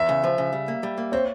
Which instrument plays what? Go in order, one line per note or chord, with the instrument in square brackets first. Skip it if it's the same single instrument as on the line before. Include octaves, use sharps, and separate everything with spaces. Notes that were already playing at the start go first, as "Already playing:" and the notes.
Already playing: [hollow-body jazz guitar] E2 [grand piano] E5
[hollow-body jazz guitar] C#3
F3
C#3
G3
A#3
G3
A#3
[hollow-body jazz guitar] C4 [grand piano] C#5